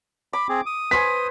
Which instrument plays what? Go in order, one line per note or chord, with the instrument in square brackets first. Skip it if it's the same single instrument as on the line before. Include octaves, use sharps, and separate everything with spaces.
[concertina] B5 [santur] D6
[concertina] C4 G#4
D#6
[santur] B4 C5 G#5 [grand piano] B6